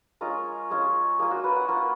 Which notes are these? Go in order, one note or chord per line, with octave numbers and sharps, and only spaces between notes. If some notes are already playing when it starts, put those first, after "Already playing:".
G#3 C#4 F4 A#4
G#3 C#4 F4
A#3 F4 G#4
F#4
B4
F#5
A#3 F4 F#5